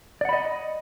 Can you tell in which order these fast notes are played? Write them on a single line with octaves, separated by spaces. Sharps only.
D5 F#5 B5 D#5